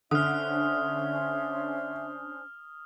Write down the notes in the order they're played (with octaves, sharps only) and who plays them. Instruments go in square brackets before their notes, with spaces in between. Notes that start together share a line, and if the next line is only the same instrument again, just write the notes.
[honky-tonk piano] D3 [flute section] C#4 D4 C5 [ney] E5 [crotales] D#6 F6